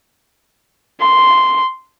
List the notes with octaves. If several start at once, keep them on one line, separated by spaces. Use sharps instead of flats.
C6